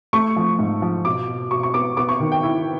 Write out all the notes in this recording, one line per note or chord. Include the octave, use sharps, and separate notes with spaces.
A3 C#6
F3
G#2
F3
B2 D6
B2
B2 C#6
C#6
B3 D6
B3 D6
C#6
D#3
G5
E4